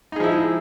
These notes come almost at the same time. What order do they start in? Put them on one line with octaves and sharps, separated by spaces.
D#4 G#4 F3 E4